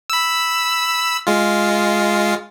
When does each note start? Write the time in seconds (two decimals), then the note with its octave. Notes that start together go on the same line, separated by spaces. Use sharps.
0.10 B5 E6
1.27 G#3 F4